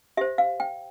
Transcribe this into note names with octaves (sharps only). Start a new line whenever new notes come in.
G4 C5 E5
F5
G5